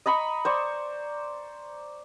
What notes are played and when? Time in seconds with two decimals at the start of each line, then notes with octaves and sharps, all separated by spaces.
0.06 D#5 A#5 B5 C#6
0.45 C5 D5 C#6